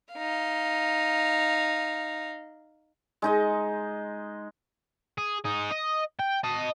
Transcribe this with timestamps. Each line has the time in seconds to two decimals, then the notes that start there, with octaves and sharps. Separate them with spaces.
0.14 D#4 F5
3.22 G#3 D#4 D#5
5.18 G#4
5.45 D#4 G#4
5.71 D#5
6.19 G5
6.44 D#5 A5